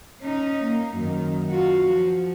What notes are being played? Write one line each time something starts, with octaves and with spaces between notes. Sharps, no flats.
C#4 D#4
A#3
F#2 D#3
F4 F#4
F3